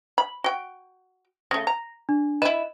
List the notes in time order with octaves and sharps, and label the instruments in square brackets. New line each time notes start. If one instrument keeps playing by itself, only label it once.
[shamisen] B5
F#4 G5
[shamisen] C#3 A3 [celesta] A#6
[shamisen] A#5
[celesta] D4
[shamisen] E4 B4 [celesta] D#5 E7